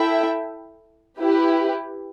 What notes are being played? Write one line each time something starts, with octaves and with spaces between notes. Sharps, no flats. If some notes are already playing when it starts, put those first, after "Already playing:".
Already playing: E4 A4 E5 G5
E4 G4 B4